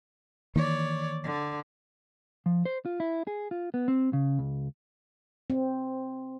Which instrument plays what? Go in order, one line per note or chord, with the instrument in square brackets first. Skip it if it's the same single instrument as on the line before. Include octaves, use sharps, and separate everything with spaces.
[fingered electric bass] D#3 E3 A#3 [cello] C#5 D5
[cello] D3
[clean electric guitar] F3
C5
F4
E4
G#4
F4
B3
C4
C#3
C#2
[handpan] C4